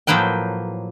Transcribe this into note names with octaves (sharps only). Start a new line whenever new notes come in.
A2 F3 F#3 A#3 B4 G5